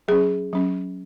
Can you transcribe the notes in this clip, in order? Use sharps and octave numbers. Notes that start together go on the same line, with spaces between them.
F#3 C#4 G#4
F#3 C#4